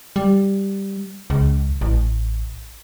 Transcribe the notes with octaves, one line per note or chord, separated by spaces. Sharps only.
G3
C#2
A1